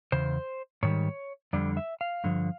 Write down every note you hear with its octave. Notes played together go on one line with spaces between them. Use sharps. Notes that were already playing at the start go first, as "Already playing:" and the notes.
E2 C#3 C5
G#2 D#3 G3 C#5
F2 D3 G3 D5
E5
F5
G2 D3 F3